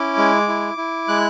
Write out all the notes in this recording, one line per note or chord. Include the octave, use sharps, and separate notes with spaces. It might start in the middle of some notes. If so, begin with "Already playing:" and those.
Already playing: C#4 E4 D6
G#3
E4
E4
G#3 F#6